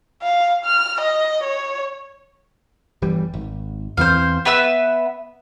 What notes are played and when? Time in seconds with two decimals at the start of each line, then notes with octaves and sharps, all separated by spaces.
0.23 F5
0.65 F6
1.01 D#5
1.44 C#5
3.02 G1 E3 G3
3.34 G#1
3.97 E2 E3 C4 C5 F5
4.45 B3 B4 E5 E6